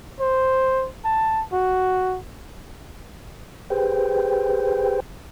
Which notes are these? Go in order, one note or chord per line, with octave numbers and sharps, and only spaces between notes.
C5
A5
F#4
G4 G#4 B4 C5 G5